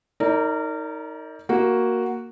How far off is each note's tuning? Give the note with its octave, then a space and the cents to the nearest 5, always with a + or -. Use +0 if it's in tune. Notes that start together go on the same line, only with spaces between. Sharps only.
D#4 +20 A#4 -25 D5 -35
A#3 +0 F#4 +0